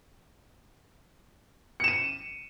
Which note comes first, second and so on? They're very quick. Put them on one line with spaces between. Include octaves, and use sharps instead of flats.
C#7 E7 D#7